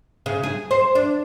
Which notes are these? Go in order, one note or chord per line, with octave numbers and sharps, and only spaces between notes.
C#3
G#4
C5
D4